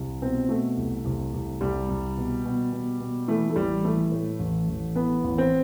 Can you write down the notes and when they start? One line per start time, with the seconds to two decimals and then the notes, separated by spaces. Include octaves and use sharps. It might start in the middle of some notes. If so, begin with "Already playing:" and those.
Already playing: C2
0.22 B2 C4
0.49 B2 A3
0.77 C2
1.05 C2
1.33 C2
1.61 C2 G3
1.89 C2
2.17 B2
2.45 B2
2.72 B2
3.00 B2
3.28 E3 A3
3.50 A3
3.56 A1 G3
3.84 E3 A3
4.12 A2
4.39 A1
4.68 A1
4.96 E3 B3
5.24 A1
5.38 C4